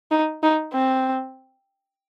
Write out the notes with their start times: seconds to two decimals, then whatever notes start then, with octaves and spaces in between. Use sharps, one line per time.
0.11 D#4
0.43 D#4
0.74 C4